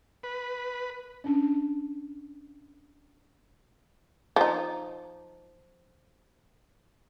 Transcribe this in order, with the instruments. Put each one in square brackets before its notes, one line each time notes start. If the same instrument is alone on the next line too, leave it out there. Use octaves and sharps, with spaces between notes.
[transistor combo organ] B4
[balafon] C#4 D4
[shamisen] F3 D#4